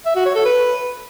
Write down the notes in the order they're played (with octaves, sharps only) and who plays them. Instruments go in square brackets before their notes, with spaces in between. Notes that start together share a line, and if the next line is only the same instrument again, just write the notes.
[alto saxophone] E5
F#4
C#5
A4
B4